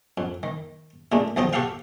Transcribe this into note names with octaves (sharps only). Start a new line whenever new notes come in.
F2
D#3
A#2 G#3 A3 D4
B1 D#3 F3 D#5 G5
F#4 G4 A4 F5 G5